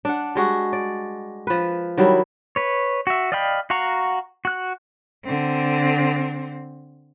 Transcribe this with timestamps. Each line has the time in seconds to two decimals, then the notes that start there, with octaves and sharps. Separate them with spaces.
0.05 D4 F#5
0.35 G3 G#3 F#4
0.73 D5
1.47 F3 B4
1.97 D#3 F#3 G3 E4
2.56 B4 C#5
3.07 F#4 E5
3.32 D5 D#5 F5 G5 B5
3.70 F#4 F5 F#5 A#5 C#6
4.45 F#4 F#6
5.25 D3 C4